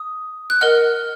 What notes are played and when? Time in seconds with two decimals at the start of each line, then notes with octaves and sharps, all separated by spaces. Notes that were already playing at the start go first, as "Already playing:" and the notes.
Already playing: D#6
0.50 F#6
0.61 A#4 D#5 F#5 F6